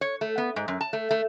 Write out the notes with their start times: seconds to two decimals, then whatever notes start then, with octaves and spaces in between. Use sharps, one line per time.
0.01 C#5
0.21 A3
0.38 B3
0.56 G#2
0.68 F#2
0.81 A5
0.93 A3
1.11 A3